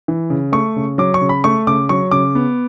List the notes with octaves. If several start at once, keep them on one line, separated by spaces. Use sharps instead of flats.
E3
C#3
A3 C#6
C#3
F#3 D6
C#6
C#3
B5
A3 C#6
C#3 D6
F#3 C#6
C#3 D6
B3